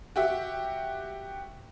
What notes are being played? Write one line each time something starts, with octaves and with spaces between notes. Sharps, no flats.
F#4 G4 E5